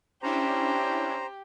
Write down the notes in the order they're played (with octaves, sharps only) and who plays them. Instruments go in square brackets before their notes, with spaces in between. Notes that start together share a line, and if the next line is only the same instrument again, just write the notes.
[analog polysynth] C#4 D4 E4 [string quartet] G4 [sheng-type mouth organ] C5 A#5